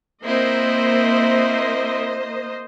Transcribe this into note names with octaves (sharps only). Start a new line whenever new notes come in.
A#3 C4 E4 C5 D#5